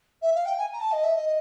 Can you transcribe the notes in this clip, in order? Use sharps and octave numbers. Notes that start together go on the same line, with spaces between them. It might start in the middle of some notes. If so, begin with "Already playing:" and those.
E5
F5
G5
G#5
A#5
A5
D#5
E5
D#5